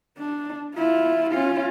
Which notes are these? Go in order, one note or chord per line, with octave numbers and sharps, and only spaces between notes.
D4
E4 F4
C#4 F4